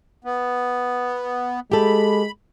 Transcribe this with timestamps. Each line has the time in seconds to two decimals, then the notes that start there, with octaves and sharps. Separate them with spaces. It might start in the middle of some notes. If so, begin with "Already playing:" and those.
0.24 B3
1.72 G#3 G4 A4 B5